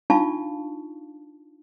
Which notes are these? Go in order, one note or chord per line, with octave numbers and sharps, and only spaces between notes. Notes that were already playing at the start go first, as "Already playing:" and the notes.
D4 D#4 F4 F5 A5 C#6